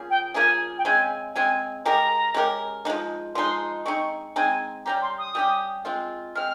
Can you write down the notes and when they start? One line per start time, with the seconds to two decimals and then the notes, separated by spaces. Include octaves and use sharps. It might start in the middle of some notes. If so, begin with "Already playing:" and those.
Already playing: F3 A#3 C#4 G#4
0.10 G5
0.34 F3 A#3 C#4 G#4 G#5
0.78 G5
0.85 C#3 G#3 C4 G#5
1.34 C#3 G#3 C4 G#5
1.85 G#3 C#4 G4 A#4 A#5
2.34 G#3 C#4 G4 A#4
2.85 F3 G#3 D#4
3.35 F3 G#3 D#4 C6
3.85 G#3 C4 D#4 C#6
4.36 G#3 C4 D#4 G#5
4.85 G3 C#4 G4 A#5
5.02 C6
5.18 D#6
5.35 G3 C#4 G4
5.85 G#3 C4 F4
6.35 G#3 C4 F6